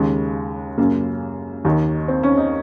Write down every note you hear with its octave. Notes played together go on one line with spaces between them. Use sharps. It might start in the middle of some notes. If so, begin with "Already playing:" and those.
Already playing: D#2 C#3 G#3
F#2 C#3 A#3
D#2 D#3
C4
C#4
D#4